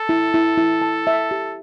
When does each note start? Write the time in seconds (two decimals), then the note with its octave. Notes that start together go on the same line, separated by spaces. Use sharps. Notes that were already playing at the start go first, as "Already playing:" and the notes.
Already playing: A4
0.09 E4
0.34 E4
0.57 E4
0.82 A5
1.07 E5
1.31 G4